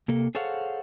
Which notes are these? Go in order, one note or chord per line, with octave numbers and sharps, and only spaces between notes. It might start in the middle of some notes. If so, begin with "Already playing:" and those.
C3 A#3 A4
G#4 A4 C5 C#5 F5 F#5